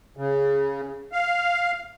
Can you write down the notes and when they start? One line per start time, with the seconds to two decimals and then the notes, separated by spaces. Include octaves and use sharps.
0.17 C#3
1.12 F5